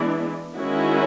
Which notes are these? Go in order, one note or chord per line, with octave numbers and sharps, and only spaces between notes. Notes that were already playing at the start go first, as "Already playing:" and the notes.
Already playing: E3 G#3 B3 D4
D#3 G#3 C#4 E4 F#4